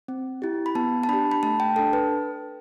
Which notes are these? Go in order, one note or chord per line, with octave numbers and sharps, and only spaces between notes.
C4
E4 G4
B5
B3 A5
A5
D4 G4 B5
B5
A3 A5
G5
D4 A4 A5
B4